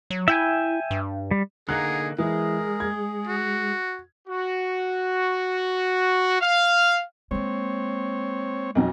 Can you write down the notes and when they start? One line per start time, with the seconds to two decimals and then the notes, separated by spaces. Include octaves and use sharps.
0.10 F#3
0.28 E4 E5 G5 G#5
0.91 G2
1.31 G3
1.69 D3 A#3 D#4 G#4 F#5 A#5 F#6
2.18 E3 G#3 G#4 A#4
2.80 G#6
3.27 F#4
4.28 F#4
6.41 F5
7.31 G#3 A#3 C4 C#5
8.75 B1 F2 F#3